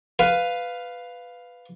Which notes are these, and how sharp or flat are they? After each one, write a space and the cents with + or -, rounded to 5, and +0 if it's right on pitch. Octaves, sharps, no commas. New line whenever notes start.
B4 +10 F5 +5